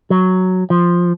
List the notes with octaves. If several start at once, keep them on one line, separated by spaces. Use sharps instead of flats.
F#3
F3